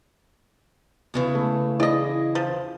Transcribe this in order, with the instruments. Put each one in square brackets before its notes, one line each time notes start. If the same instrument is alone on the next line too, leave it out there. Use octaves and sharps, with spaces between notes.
[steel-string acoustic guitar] E2 C#3 E3
[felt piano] A3
[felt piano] E4 G#4 [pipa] D5 D#5
[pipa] F3